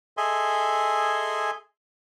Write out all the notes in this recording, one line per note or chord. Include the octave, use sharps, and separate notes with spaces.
G#4 A4 D#5 E5 G#5 C6